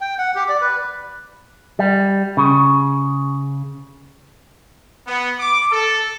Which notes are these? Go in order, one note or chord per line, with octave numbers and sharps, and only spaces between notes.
G5
F#5
G4
D5
B4
G3
C#3
B3
D6
A4